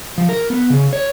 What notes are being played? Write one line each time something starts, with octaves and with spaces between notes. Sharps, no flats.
F3
A#4
B3
C#3
C#5